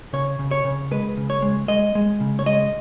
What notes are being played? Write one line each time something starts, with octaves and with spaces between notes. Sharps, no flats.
C#3 C#5
C#3
C#5
C#3
G#3 B4
C#3
C#5
G#3
G#3 D#5
G#3
C#3
C#5
G#3 D#5